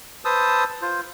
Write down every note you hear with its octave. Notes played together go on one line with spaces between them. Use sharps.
B4 C5 A5 D#6 E6
F4 C5